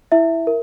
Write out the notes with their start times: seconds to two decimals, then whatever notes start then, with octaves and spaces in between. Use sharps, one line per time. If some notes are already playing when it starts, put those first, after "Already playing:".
0.12 E4 E5
0.47 A#4